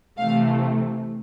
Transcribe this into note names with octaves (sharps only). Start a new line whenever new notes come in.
C3 E3 A3 F5